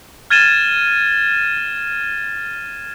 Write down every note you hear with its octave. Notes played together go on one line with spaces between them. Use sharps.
F6 G#6 A6 D#7 E7 G7